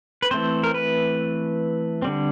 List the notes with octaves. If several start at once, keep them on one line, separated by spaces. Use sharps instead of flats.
B4
E3 A3 C4 C5
A#4
B4
D3 G3 C4